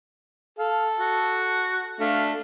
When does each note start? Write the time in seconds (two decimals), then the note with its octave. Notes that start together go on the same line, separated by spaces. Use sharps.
0.59 A4 F5
1.00 F#4
2.00 A3 D4 F5